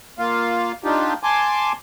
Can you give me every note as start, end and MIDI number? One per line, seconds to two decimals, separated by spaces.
0.19 0.72 58
0.19 0.72 65
0.19 0.72 77
0.84 1.14 62
0.84 1.14 63
0.84 1.14 65
0.84 1.14 67
1.23 1.72 80
1.23 1.72 81
1.23 1.72 84
1.23 1.72 86